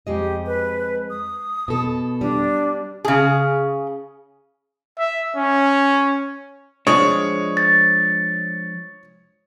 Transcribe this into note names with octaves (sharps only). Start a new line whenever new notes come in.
F2 G#3 G4 D#5
B4
D#6
B2 A4
G3 D4
C#3 G#4
E5
C#4
F3 G#3 D4 C#5 C#6 D#6
A6